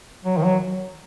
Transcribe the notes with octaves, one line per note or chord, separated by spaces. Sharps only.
F#3
D#3
F#3